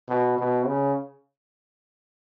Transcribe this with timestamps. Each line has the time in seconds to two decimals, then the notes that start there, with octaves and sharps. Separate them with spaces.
0.09 B2
0.38 B2
0.67 C#3